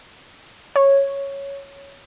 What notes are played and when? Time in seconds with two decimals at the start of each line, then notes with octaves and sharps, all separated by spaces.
0.76 C#5